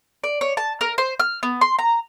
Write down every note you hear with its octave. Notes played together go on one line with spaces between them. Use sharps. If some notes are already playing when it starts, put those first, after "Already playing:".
D5
C#5
A5
A#4
C5
F6
B3
C6
A#5